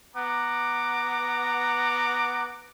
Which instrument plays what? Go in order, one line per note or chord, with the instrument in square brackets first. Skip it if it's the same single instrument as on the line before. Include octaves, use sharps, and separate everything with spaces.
[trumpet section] B3 F#5 A#5 D6